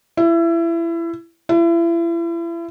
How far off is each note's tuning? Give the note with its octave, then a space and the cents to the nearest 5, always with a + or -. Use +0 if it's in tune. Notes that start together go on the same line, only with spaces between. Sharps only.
E4 +25
E4 +35